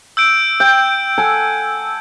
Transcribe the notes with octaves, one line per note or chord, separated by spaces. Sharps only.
E6 G6 D7
G5 G6
A4 F#5 G#5